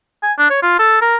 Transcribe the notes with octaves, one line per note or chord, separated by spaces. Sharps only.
G#5
D4
C#5
F4
A4
A#4